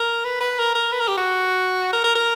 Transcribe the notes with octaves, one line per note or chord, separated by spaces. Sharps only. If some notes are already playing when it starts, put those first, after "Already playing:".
Already playing: A#4
B4
B4
A#4
A#4
B4
A#4
G4
F#4
A#4
A#4
A#4